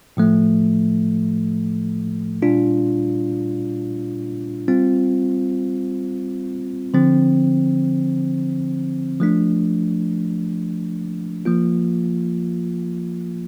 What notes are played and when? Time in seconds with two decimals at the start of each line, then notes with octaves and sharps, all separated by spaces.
0.17 A2 F3 A3
2.42 A#2 G3 D4 F4
4.68 G3 C4 F4
6.94 D3 F3 C4
9.20 F3 A3 D4
11.45 F3 A#3 F4